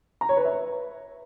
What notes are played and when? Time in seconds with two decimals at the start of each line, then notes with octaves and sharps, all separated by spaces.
0.21 A#5
0.29 C#5
0.37 B4
0.45 E5
0.53 B4